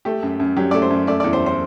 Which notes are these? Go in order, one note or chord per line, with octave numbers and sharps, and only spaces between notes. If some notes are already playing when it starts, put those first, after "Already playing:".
A3 G4
F#2
F#2
F#3 G4
A3 D5
C5
F#2
A3 D5
D5
E2
C5
C5